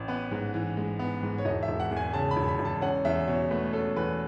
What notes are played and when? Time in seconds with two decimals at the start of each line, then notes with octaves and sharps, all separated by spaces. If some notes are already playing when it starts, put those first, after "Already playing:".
Already playing: A1
0.08 B3 B4
0.31 G#2
0.54 E3
0.77 G#3
0.99 B3
1.23 G#2
1.38 C#5
1.45 E1 D#5
1.63 E5
1.68 E1
1.80 F#5
1.91 E2
1.97 G#5
2.13 C#3 A5
2.31 B5
2.37 E1
2.48 B5
2.59 E1
2.65 A5
2.82 C#4 F#5
3.05 E2 E5
3.28 B2 C#5
3.51 A3 B4
3.73 C#4 A4
3.96 E2 B4